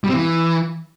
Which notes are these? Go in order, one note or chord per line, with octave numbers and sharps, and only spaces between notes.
G3
C4
E3